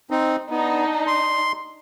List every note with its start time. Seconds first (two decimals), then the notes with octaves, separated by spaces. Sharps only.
0.10 C4 D#4
0.50 B3 D4 D#4
1.07 C6